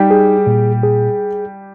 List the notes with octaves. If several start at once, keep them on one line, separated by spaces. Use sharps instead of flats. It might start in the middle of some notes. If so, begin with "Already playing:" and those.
Already playing: G3 D#4 G4
G#4
A#2
G#4